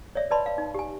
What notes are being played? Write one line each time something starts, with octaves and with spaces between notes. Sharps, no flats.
C#5 D5 E5
B4 D5 D#5 A5 B5 C6
F5
D#4
G4 G#5